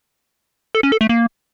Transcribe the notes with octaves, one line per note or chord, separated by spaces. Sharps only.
A4
C#4
A4
A3
A#3